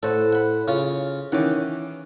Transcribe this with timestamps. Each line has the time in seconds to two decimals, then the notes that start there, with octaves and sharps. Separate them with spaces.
0.03 A2 A4 C5 F#5
0.33 F#5 B5
0.68 C#3 F4 C#5
1.32 D#3 E3 C#4 F#5 D6